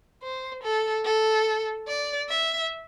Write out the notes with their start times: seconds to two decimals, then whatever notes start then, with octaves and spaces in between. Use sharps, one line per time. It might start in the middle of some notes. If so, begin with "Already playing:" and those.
0.23 C5
0.64 A4
1.05 A4
1.88 D5
2.29 E5